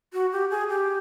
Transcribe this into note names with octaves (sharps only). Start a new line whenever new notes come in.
F#4
G4
G#4
G4